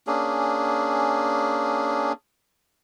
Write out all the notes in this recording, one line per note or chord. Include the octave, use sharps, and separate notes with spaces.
A#3 C#4 D4 G#4